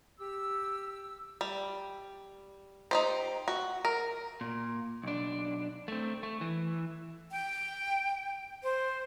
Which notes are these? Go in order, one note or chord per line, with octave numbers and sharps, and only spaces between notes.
G4 E6
G3
D#4 G4 C5
F#4
A#4
A#2
B1 D4
A3 C4
A3
E3
G5
C5